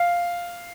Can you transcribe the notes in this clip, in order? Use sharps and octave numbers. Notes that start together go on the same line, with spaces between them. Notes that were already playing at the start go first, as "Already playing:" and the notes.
Already playing: F5